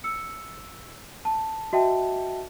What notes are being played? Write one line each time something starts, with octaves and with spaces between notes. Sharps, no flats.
E6 C#7
A5
F#4 D#5 E5 G5 A5